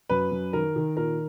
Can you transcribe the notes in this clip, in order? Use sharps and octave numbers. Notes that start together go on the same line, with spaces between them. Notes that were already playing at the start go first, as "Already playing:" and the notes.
F#2 B4
F#2
D#3 A#4
D#3
A#2 A#4